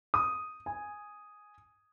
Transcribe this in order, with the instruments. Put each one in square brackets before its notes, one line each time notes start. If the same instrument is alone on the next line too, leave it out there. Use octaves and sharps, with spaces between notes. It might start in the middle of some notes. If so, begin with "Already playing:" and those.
[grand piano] D#6
G#5